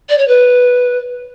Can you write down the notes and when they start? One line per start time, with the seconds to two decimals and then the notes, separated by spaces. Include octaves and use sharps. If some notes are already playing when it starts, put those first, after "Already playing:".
0.09 D5
0.18 C#5
0.27 B4